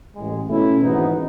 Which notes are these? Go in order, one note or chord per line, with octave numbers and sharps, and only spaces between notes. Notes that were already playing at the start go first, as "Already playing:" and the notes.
A1 A2 G#3
B2 A3 C#4 E4
G#1 G#2 E3 B3 D#4